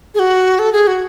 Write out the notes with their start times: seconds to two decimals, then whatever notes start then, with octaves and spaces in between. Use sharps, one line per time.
0.15 G#4
0.19 F#4
0.59 A4
0.72 G#4
0.87 F#4